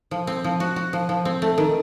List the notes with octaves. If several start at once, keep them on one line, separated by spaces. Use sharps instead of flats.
F3
C4
F3
F#4
F#4
F3
F3
C4
A3
D#3